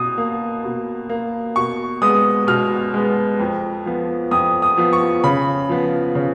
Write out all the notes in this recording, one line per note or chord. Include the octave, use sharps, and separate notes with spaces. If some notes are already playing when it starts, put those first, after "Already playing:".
Already playing: B2 D#6
A#3
B2
A#3
B2 C#6
G#3 B3 D#6
B2 F6
G#3 B3
F2
F3 B3
F2 D#6
D#6
F3 B3
C#6
C#3 B5
F3 B3
C#3